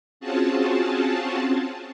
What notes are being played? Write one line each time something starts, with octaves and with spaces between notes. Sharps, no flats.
C4 C#4 F4 F#4 G#4 A5